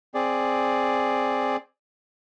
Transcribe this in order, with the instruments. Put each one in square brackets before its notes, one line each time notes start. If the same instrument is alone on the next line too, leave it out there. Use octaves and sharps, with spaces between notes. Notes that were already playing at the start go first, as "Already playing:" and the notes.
[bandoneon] C4 G#4 D5